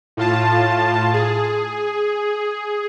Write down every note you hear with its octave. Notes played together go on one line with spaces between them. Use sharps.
A2 F4 A5
G#4